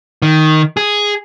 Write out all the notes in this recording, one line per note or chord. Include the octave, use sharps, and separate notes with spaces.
D#3
G#4